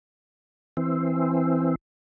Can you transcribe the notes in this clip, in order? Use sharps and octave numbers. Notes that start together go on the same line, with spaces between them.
E3 C4